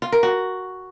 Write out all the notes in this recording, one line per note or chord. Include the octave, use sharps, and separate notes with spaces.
F4
A#4
F#4